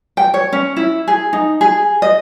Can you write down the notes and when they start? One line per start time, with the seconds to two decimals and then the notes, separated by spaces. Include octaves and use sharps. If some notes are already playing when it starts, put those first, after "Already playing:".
0.17 G5
0.34 C#5
0.53 C#4
0.77 E4
1.08 G#4
1.33 D#4
1.61 G#4
2.02 D#5